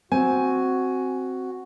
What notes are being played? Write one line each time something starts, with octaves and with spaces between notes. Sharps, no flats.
C4 F#4 G#5